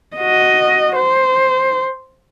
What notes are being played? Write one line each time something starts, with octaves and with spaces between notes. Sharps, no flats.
F#4 D#5
C5